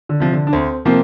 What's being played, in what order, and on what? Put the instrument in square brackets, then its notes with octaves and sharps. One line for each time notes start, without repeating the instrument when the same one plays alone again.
[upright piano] D3
[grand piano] C3 F3
[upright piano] D3
D4
[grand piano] D2 [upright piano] C4
[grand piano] C3 F3 C4 [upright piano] A#3